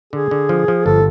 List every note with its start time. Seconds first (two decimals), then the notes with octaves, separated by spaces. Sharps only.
0.13 D3 G#4
0.31 D3
0.49 F3
0.68 F3
0.86 G1 A4